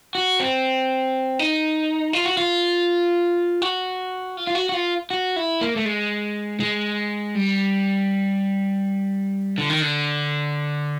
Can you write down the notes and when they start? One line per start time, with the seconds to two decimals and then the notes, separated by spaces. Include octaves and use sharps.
0.15 F#4
0.40 C4
1.39 D#4
2.13 F4
2.25 F#4
2.37 F4
3.62 F#4
4.37 F4
4.47 F4
4.55 F#4
4.69 F#4
4.74 F4
5.11 F#4
5.36 E4
5.61 A#3
5.76 A3
5.85 G#3
6.60 G#3
7.35 G3
9.58 D3
9.70 D#3
9.82 D3